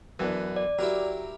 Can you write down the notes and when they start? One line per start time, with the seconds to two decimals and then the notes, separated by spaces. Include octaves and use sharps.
0.19 F#2 E3 B3 D4
0.56 D5
0.79 F#3 E4 G4 A#4